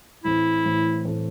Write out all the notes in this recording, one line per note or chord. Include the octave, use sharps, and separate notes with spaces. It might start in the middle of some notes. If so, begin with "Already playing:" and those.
A2 E3 A3 C4 E4
A2 E3 A3 C4
A2 E3 A3 C4